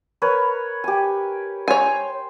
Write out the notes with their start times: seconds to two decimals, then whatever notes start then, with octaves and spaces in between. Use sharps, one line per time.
0.22 A#4 B4 C#5
0.84 G4 G#5
1.68 C5 C#5 G#5